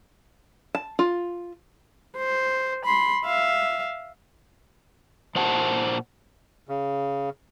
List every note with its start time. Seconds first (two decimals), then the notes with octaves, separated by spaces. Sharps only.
0.75 A5
0.99 F4
2.16 C5
2.85 B5 C6
3.25 E5 F5
5.35 A#2 C5 F#5 A5
6.69 C#3